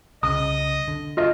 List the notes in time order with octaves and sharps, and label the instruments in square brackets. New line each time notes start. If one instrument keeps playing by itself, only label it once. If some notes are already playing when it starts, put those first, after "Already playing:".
[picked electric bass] C2 C#3 [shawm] D#5 [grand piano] D#6
[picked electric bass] D3
[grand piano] F4 D#5